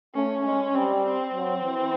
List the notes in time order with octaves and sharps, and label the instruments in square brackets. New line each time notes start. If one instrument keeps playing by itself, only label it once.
[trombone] A3 [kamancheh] C#4
[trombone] G#3 [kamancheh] C#4
[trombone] G3 [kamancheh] C4
[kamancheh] C4
[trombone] F#3
E3